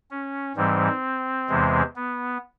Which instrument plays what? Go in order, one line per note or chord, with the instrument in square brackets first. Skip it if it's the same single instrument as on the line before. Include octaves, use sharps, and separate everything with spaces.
[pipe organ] C#4
G#2 E3 G3 C4
E2 C3 E3 G#3
B3